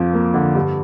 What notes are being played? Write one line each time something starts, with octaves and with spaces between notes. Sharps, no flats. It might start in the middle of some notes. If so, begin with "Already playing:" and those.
Already playing: F2 F3
A#3
D3
G2